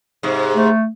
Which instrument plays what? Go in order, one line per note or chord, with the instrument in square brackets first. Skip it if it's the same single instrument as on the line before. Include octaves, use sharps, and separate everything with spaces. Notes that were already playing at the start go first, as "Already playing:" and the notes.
[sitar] G#2 C3
[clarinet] A3